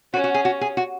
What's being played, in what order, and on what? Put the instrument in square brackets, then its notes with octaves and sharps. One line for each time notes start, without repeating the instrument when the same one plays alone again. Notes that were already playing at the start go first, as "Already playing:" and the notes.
[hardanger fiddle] C#4 [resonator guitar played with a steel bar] F#4
[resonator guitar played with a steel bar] F#4
G#4
F#4
G#4
F#4